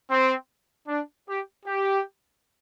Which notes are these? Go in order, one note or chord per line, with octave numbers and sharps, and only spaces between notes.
C4
D4
G4
G4